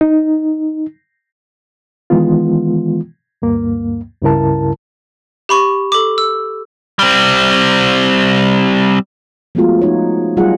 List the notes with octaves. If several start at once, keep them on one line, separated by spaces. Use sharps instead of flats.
D#4
D#3 E3 G#3 B3 F4
D2 G2 A#3
C#2 G2 C#3 E4 A#4 A5
G4 B5 C#6
A4 D6
E6
G3 C4
F3 G#3 A3 B3 F4 F#4
F3 D#4 C#5
F#3 G3 F4 G#4 D#5 F#5